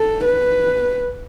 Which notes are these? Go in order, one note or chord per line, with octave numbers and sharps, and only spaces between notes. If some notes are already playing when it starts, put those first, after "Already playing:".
Already playing: A4
B4